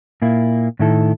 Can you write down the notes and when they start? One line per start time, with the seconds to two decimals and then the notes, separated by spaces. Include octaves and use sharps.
0.22 A#2 A#3 E4
0.79 A2 D#3 E4 A4